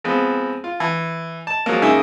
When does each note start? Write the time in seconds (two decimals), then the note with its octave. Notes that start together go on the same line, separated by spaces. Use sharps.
0.04 F3 G#3 B3 C4
0.64 F4
0.80 E3
1.47 A5
1.66 F3 F#3 G#3 A#3
1.82 C#3 G#3 A#3 D#4 E5 G#5